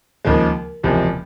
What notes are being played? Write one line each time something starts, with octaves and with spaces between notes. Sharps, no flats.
D#2 C#3 F3 G#3
F#1 E2 C3 F3 G#3